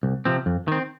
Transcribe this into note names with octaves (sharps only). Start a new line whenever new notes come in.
C2
C3 F3 C4
F2
D#3 C4